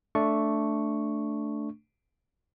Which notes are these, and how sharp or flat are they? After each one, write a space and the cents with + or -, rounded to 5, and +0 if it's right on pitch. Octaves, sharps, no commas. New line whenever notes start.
A3 +0 D4 -5 C#6 +0